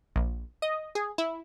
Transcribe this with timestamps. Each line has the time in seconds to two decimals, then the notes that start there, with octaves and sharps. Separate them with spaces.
0.16 A#1
0.62 D#5
0.95 G#4
1.18 E4